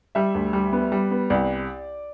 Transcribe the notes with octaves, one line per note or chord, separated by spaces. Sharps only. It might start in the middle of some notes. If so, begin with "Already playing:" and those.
G3 E5
D2
G3
B3
G3
B3
C2 D5